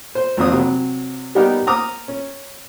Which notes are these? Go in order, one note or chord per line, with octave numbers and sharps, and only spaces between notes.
C5
G#1 F2 A#3 D#6
C3 F#3
G3 B3 D#4 G4 A#4
A#5 D6 D#6 F6
C#4